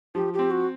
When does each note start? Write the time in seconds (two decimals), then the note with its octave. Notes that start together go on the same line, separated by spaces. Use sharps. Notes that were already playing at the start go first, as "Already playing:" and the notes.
0.15 F3 G4
0.33 G4
0.39 C4
0.51 F#4